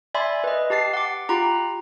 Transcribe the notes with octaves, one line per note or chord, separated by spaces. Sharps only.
D5 E5 G#5 B5 C6
B4 D#5
G4 A5 A6 C7
F#5 D6
F4 G4 A#5 B5